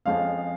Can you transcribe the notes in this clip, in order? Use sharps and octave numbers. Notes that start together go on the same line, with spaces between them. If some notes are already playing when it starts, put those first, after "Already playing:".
F2 F3 G#3 C#4 F5